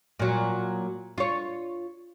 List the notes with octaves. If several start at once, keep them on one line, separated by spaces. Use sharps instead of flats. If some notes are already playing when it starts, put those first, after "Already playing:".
A#2 F#3
F4 C#5